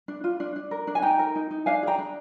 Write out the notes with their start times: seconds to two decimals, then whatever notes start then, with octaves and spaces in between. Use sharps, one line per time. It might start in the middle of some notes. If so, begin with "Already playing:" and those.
0.08 D4
0.24 F4
0.40 D4
0.56 D4
0.71 A#4
0.87 D4
0.95 G#5
1.02 D#4 G5 A#5
1.19 A#4
1.36 D#4
1.51 D#4
1.66 D4 F5 G#5
1.83 G#4 G5 A#5
1.99 D4